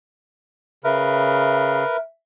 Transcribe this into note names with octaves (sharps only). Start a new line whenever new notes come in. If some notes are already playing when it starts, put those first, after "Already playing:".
C#3 A#4 B4 E5